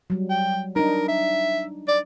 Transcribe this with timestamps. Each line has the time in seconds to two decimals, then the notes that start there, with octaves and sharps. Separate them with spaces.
0.10 F#3 G3
0.30 G5
0.76 D4 D#4 A#4
1.08 E5
1.88 D5